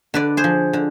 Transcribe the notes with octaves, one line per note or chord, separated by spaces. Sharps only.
D3 B4 D5
G#4 C5
F3
D3